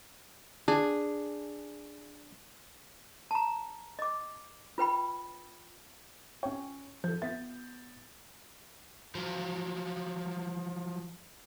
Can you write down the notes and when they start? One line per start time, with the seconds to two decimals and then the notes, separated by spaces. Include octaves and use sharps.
0.68 D4 G#4
3.31 A5 A#5
3.99 D#5 D6
4.78 F4 B4 G5 B5
6.43 C#4 C#5 G5
7.04 F3 A4 G6
7.22 B3 E5 A6 B6
9.15 F3 F#3